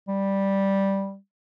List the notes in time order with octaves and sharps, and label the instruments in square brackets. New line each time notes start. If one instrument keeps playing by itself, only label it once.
[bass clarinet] G3